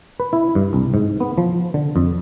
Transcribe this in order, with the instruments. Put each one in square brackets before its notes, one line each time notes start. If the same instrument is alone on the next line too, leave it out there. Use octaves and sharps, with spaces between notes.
[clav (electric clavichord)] B4
E4
G2
C2
G#2
B3
F3
D3
F2